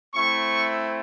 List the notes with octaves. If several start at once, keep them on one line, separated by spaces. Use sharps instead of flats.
A3 C4 E4 C#6